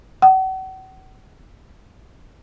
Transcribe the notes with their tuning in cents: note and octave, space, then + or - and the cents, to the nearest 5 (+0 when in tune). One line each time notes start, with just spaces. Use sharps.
F#5 +40